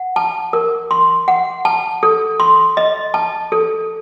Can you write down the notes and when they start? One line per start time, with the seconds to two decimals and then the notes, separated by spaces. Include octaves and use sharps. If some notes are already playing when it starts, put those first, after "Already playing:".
Already playing: F#5
0.16 A5
0.53 A#4
0.91 C6
1.28 F#5
1.65 A5
2.03 A4
2.40 C6
2.77 D#5
3.14 A5
3.52 A4